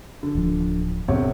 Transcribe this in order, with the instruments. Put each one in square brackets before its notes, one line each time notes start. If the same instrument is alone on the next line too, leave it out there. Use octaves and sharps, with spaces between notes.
[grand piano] D3
[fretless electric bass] D1 E3 F3
[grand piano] E1 C3 C#5